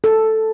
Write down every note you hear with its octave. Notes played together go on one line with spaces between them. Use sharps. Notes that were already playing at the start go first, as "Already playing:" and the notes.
A4